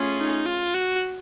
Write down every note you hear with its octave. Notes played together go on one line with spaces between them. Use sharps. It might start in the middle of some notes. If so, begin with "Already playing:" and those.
Already playing: A3 C#4 F4 G#4
D#4
F4
F#4